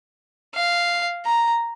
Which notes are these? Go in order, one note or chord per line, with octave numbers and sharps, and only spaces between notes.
F5
A#5